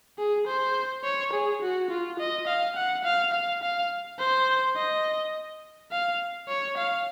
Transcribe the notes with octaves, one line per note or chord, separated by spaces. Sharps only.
G#4
C5
C#5
G#4
F#4
F4
D#5
F5
F#5
F5
F5
F5
C5
D#5
F5
C#5
F5